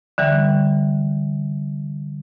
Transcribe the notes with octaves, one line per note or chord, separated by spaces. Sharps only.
D3 E3 G3